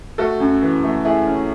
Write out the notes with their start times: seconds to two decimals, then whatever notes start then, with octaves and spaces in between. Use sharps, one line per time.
0.18 A3 F#4 A4
0.40 F#2
0.62 E3
0.84 A3
1.05 A3 E4 G#4
1.27 C#4